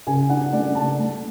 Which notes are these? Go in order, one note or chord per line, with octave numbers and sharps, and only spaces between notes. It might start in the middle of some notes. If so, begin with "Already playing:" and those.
C#3 G#5
D4 F#5
A3 D5
C#3 A5
A3